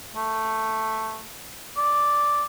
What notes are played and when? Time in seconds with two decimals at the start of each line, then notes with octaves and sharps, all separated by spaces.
0.16 A3
1.77 D5